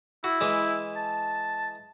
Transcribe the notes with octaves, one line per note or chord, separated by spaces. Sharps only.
E4 F#4
E3 G#3
A5